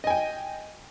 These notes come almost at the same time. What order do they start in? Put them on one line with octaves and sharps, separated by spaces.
D#5 G#5 G5